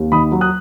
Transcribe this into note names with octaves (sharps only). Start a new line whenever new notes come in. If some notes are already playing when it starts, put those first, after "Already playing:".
Already playing: D#2
D#3 B5 D#6
F#3
D#6 F#6